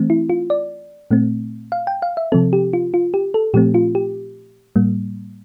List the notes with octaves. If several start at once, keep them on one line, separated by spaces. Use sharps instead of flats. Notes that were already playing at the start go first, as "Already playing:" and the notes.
Already playing: E3 A3 C4
E4
F4
D5
A#2 A3 C4
F5
G5
F5
E5
C3 F3 C4 A4
G4
F4
F4
G4
A4
A#2 F3 A3 C4 G4
F4
G4
A2 G3 A#3